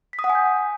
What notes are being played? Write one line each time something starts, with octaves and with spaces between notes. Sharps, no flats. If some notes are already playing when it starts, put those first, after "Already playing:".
B6
D#6
F#5
G#5
G6